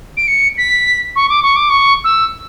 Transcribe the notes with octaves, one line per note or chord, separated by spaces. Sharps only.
D7
C#7
B6
C#6
D6
C#6
D6
C#6
E6